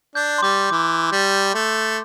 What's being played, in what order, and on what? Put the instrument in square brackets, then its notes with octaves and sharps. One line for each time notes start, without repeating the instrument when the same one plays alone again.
[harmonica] D4 [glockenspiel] G6
[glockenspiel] C6
[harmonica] G3 [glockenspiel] D6
[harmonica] E3 [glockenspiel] D6
[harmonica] G3
A3